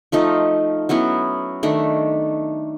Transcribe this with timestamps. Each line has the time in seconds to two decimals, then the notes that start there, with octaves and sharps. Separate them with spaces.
0.12 F3 A3 D#4 F4
0.89 F#3 B3 C#4 E4
1.63 D#3 A3 D4